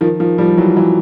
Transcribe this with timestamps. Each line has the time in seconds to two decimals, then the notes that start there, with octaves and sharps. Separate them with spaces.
0.01 D#3 F3
0.20 D#3 F3
0.38 F3 G3
0.57 E3 F#3
0.76 E3 F#3